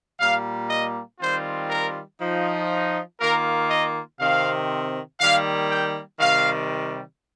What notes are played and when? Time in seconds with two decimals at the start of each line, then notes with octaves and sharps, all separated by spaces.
0.20 A#2 G3 A#3 F5
0.70 D#5
1.20 D#3 G3 C4 F4 C5
1.70 A#4
2.20 F3 D#4
3.19 D#3 A#3 F4 A#4
3.70 D#5
4.20 C3 D#3 C4 F5
5.20 D#3 G3 A#3 F5
5.70 G5
6.20 C3 D#3 G3 F5